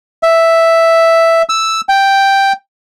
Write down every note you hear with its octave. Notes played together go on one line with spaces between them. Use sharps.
E5
E6
G5